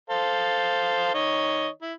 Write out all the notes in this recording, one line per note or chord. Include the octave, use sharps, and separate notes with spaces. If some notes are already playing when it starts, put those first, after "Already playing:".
A4 C5 F5
D#3 C#5 D#5
E4